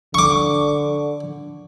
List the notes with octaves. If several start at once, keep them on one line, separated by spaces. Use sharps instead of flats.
D3 C#6 D6